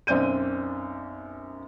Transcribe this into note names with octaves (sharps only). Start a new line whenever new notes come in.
B1 F#2 C4 D5 G6 D#7